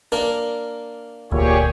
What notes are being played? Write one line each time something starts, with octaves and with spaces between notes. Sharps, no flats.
A#3 D4 A#4
E1 D2 A#2 G4 G#4 C#5